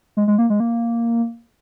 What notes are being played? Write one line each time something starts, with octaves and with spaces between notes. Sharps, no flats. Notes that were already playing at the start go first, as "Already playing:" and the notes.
G#3
G#3
A#3
G#3
A#3